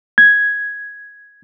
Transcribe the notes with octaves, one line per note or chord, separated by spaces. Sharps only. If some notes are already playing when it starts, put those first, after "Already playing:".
G#6